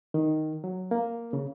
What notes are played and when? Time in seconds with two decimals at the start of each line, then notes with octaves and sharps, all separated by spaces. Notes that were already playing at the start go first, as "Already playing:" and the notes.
0.14 D#3
0.64 F#3
0.91 A#3
1.33 C#3